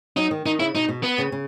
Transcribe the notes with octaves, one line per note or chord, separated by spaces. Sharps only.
F#3 D#4
D#3
D#3 D#4
C#3 E4
B2 D#4
B2
B3
C#3
C#3